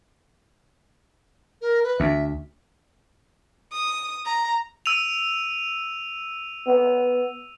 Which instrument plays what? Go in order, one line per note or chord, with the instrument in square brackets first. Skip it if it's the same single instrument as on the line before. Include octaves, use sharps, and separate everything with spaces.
[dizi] A#4
B4
[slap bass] D2 [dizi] E5
[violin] D#6
A#5
[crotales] E6 D#7 F7
[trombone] B3